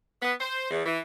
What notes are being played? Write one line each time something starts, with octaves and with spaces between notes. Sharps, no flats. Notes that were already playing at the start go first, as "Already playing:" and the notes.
B3
C5
E2
E3